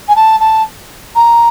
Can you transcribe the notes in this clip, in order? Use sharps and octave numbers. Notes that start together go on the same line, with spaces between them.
G#5
A5
A5
A#5